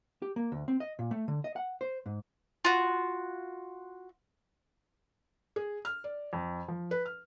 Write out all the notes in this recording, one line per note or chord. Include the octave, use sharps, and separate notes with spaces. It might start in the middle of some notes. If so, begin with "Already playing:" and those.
G4
A#3
D2
C4
D#5
A#2
A3
D3
D#5
F#5
C5
G#2
F4 F#4
G#4
F6
D5
F2
F3
B4
F6